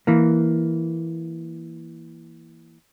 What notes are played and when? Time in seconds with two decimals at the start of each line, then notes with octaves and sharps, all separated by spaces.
0.07 E3 A#3